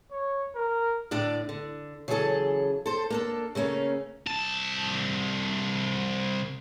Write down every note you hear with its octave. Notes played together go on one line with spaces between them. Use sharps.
C#5
A#4
A2 D3 D4 D5
D3
C#3 E3 F#3 G#4 A4 A5
A4 C5
A#3 D4 A4
C#3 A3 A#3 C#4
C2 A5